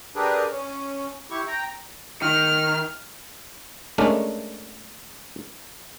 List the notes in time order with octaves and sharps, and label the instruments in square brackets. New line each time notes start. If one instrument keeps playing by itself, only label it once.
[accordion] D4 G4 G#4 A#4 B4
C#4
E4 G4 C#6
G5 A#5
[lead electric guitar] D#3 [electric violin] F6
[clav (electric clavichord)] G#3 A3 C#4 D4 A#4